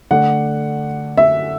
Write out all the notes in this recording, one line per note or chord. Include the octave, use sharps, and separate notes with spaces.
D3 A3 D4 F#5
E5